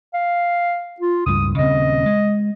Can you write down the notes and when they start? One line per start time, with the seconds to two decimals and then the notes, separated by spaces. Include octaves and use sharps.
0.14 F5
1.00 F4
1.26 C#2 G2 D#6
1.58 D#1 C#3 C4 D#5
2.06 G#3